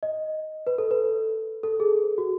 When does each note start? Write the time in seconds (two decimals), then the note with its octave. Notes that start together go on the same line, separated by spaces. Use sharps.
0.03 D#5
0.67 B4
0.78 A4
0.91 B4
1.63 A4
1.80 G#4
2.18 F#4